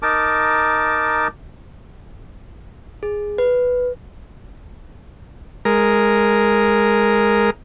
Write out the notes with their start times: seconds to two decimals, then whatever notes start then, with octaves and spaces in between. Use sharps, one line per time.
0.02 D#4 A#4 A5 D6
3.03 G#4
3.38 B4
5.65 G#3 A#4